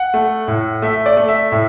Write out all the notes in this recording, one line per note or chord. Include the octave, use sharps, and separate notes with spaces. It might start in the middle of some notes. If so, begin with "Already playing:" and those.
Already playing: F#5
A3
A2
A3 E5
D5
A3
E5
A2